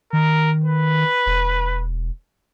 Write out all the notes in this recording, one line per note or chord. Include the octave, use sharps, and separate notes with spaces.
D#3 A#4
B4
E1